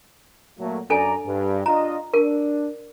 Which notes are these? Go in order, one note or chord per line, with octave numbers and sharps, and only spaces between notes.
A#2 F#3 A3
F#2 D4 A4 D5 G#5 A#5
G2
D4 F4 D#5 A#5
D4 A#4